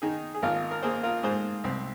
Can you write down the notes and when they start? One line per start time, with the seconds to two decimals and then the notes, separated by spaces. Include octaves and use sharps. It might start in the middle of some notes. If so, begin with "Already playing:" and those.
0.02 D#3 D#4 G#4
0.34 G#4
0.42 G#1 F4 A#4
0.71 A#4
0.83 A#3 G#4 C5
1.03 F4 A#4
1.23 G#2 G#4 C5
1.64 C2 C4